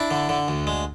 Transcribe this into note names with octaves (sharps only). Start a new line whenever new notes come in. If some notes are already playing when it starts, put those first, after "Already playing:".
Already playing: D4 E4
D3
D3
D2
G#3